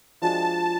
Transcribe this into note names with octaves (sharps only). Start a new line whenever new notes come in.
F3 G#3 D4 F#4 A5